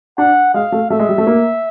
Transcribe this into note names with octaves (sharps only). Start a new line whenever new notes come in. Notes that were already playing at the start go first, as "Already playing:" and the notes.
D4 F#5
G#3 F5
A3
A3 E5
G#3
G3
A3
A#3